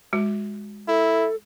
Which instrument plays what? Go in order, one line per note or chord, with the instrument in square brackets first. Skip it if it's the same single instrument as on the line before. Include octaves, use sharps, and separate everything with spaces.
[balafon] G#3 F#4
[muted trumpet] E4 [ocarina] A4